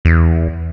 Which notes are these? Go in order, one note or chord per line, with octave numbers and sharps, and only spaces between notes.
E2